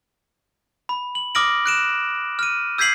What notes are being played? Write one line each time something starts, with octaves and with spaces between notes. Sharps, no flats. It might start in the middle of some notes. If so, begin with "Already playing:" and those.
B5
F#7
D6 D#6 F6 A#6 D7 F#7
F#6 D7 E7
F6 D#7
E6 G6 G#6 B6 C7 F#7